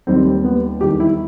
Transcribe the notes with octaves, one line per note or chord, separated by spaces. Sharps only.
D#2 D#3 G3 C4
B3
E2 D#3 G3 G4
E4